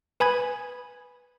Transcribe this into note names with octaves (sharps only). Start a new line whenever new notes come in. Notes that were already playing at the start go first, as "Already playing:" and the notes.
B4 G#5 B5 D#6 G#6